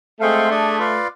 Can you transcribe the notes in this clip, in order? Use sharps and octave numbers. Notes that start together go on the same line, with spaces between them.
G#3 A3 C4 G#4 C5 F5
D4 G#4 D5 G#5
F4 B4 D5 F5